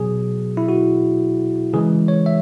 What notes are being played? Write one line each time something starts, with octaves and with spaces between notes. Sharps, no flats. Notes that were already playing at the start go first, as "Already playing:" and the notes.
Already playing: B2 F#3 G#4
E4
F#4
C#3 E3 G#3 G#4
C#5
E5